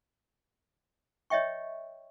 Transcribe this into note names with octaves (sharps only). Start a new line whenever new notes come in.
C#5 D#5 E5 G5 C#6